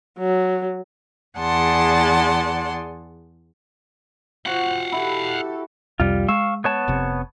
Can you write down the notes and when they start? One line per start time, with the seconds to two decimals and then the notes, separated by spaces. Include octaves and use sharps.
0.18 F#3
1.38 E2 G#4 D5 F#5 A5 C6
4.46 F4 F#4 C5 F5 F#5
4.92 E4 G4 A4
6.00 C2 F2 C3 G3 F4
6.28 G#3 F5 C#6 E6
6.64 B3 C#5 A5
6.88 F1 C3